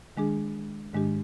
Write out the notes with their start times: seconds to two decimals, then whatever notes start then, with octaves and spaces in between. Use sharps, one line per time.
0.17 D#3 G#3 D4 G#4
0.93 G#2 D#3 G#3 D4 G4